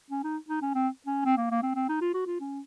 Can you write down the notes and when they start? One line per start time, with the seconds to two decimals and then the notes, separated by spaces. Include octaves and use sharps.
0.11 C#4
0.24 D#4
0.49 D#4
0.62 C#4
0.75 C4
1.07 C#4
1.25 C4
1.37 A#3
1.51 A#3
1.63 C4
1.76 C4
1.89 D#4
2.01 F4
2.14 F#4
2.27 F4
2.40 C#4